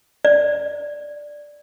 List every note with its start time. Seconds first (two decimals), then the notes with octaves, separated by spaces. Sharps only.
0.25 D5